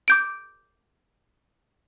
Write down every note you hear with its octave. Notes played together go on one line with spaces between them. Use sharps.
D6 G6 D7